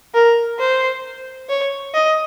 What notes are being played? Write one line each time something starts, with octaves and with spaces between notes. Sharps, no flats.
A#4
C5
C#5
D#5